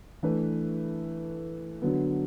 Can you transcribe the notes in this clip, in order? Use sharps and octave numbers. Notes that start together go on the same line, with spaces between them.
E3 A3 D4 B4
D3 F#3 B3